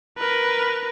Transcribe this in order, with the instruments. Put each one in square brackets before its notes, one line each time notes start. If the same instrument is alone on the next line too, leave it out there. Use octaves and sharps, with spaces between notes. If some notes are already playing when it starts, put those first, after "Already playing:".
[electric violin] A#4 B4